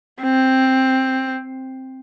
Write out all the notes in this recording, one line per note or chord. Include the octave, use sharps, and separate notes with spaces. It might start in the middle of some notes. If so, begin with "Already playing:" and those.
C4